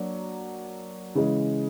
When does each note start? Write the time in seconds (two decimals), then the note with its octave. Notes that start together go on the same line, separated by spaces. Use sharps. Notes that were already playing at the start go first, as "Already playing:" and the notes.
Already playing: F#3 A#3 D4
1.15 C#3 E3 G#3